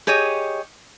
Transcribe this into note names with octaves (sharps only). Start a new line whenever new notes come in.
G4 G#4 C#5 D#5